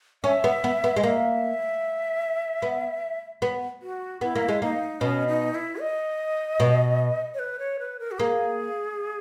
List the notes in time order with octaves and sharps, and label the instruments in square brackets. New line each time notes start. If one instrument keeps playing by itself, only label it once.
[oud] C#4 [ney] E5
[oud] B3
B3
B3
G#3
[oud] A#3 [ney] E5
[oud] B3
B3
[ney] F#4
[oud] B3 [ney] E4
[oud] A#3
G#3
[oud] A#3 [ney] D#4
[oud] B2 [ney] C#4
[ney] D#4
E4
D#5
[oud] B2
[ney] C#5
B4
C#5
B4
A#4
F#4
[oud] A#3 [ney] G#4